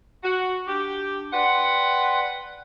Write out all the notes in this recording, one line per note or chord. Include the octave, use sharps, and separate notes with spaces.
F#4
D4 G4
B4 D5 F#5 G5 C6